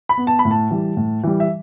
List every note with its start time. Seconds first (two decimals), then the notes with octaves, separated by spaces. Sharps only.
0.09 B5
0.18 B3
0.27 A5
0.39 B5
0.45 A2
0.51 A5
0.71 E3 G3
0.97 A2
1.23 E3 G3
1.40 E5